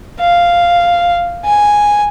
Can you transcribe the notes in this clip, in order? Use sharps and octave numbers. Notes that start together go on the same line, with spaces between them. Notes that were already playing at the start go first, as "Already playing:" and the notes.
F5
G#5